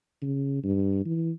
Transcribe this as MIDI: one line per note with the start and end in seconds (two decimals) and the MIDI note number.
0.22 0.61 49
0.63 1.03 43
1.05 1.31 52